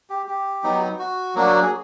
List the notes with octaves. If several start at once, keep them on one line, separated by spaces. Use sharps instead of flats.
G4
G4
F#3 B3 D#4
F#4
F#3 A#3 D4 F#4
G#4